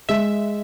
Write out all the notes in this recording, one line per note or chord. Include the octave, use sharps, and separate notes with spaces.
G#3 E5